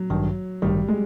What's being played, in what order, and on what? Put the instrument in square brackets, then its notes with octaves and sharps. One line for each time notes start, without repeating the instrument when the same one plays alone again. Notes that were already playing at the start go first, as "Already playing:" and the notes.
Already playing: [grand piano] F#3
[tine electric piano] A1 G2 D#3
[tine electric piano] A1 G2 D#3 [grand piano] G3
[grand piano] G#3